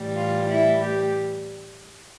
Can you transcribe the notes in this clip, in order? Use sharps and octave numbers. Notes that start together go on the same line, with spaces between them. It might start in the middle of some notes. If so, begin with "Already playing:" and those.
Already playing: A2 E3 G3
F4
E4
G4